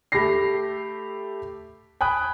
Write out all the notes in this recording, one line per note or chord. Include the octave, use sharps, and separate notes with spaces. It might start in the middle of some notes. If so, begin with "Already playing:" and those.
A3 G4 A4 B5 A#6 C7
G5 G#5 B5 D#6 F#6